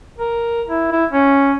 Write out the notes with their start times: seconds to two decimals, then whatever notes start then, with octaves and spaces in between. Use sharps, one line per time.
0.18 A#4
0.68 E4
0.92 E4
1.12 C#4